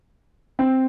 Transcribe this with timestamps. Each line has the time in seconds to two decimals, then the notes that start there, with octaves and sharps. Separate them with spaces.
0.59 C4